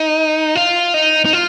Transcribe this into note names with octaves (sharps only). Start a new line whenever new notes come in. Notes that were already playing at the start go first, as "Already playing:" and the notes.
Already playing: D#4
F4
D#4
D#4
F4